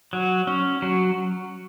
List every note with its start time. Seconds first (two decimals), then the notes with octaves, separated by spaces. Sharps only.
0.13 F#3
0.47 C#4
0.82 F#3